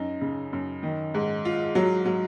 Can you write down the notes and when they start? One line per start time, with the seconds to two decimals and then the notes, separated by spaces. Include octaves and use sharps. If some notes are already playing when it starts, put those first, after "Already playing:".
Already playing: F#2 D#4
0.21 C#3
0.53 F#2
0.83 D#3
1.14 G#2
1.45 F4
1.75 F#3
2.05 F#3